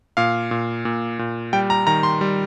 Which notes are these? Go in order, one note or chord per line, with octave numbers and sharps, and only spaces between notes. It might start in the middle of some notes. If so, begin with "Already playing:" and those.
A#2 F5
A#2
A#2
A#2
G3 G5
A#5
D#3 A#5
C6
G3